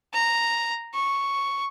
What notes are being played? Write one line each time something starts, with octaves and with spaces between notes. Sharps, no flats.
A#5
C#6